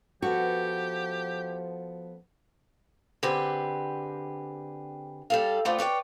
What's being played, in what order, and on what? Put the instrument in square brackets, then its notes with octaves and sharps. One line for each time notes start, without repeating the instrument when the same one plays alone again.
[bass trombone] F3 [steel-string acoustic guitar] B3 A4 [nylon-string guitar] F#4 [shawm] G4
[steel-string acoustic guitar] D3 C4 G4 G#4 B4
G3 A4 F5
A3 B3 C4 D4 F4
B4 C#5 D5 G5